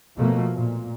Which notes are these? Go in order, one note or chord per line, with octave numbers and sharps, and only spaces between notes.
B2 F3 A3 A#3
A#2